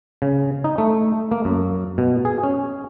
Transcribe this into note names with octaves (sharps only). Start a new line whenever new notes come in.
C#3
D#4
A3
A#3
F#2
B2
G#4
C#4